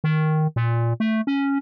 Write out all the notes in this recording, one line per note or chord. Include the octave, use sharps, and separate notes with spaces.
D#3
A#2
A3
C#4